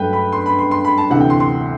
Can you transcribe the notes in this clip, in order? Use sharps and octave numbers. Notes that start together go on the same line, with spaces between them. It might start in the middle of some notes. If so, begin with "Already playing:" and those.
Already playing: G2 F#3 A3 B4 G5
B5
C6
B5
C6
C6
B5
A5
D2 C3 E3 F#5
G5
C6
C6